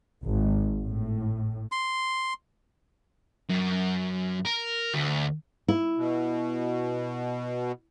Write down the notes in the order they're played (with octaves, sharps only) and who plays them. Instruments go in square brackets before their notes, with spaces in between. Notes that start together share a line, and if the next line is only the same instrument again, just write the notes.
[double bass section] G#1
A2
[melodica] C6
[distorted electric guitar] F#2
A#4
D2
[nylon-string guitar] E4
[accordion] B2